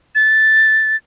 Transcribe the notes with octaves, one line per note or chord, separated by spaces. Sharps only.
A6